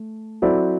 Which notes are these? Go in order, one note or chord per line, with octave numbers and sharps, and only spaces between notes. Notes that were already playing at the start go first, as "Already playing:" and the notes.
Already playing: A3
F#3 C4 E4 A4 D5